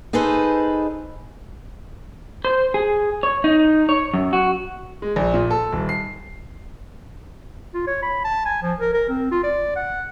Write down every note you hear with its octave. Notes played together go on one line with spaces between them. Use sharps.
D#4 G#4 A4 B4 C5
C5
G#4
C#5
D#4
C#5
F#2
F#4
G#3
A#1
A#2
A4
D#1
C7
F4
C#5
B5
A5
G#5
F3
A#4
A#4
C4
F4
D5
F#5